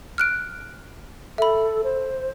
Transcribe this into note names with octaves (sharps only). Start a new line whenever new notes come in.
F6 F#6 D7
A4 E5 B5
C5